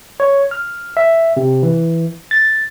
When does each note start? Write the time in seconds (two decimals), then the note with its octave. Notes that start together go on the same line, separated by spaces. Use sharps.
0.20 C#5
0.51 F6
0.97 E5
1.37 C3
1.63 E3
2.31 A6